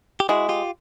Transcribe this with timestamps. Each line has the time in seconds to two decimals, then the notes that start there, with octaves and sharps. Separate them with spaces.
0.20 G4
0.29 G#3 E4 F#4
0.49 F4 G4